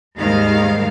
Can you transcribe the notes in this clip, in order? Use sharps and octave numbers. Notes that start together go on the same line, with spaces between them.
D#2 G#2 D#3 G3 F5